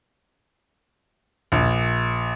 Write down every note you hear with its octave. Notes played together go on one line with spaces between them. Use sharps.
A#1